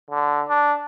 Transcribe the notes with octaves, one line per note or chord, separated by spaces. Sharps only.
D3
D4